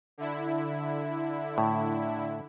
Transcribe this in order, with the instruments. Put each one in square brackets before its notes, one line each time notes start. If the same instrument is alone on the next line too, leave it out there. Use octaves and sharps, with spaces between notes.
[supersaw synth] D3 E4
[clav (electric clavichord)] A2